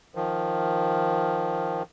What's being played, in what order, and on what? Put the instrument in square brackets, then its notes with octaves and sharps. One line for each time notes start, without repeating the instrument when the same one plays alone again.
[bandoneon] D#3 F3